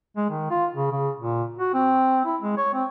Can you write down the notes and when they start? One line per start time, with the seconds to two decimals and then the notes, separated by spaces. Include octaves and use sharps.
0.16 G#3
0.30 D#3
0.50 F4
0.75 C#3
0.91 C#3
1.19 A#2
1.59 F#4
1.74 C4
2.25 E4
2.42 G#3
2.57 C#5
2.74 C4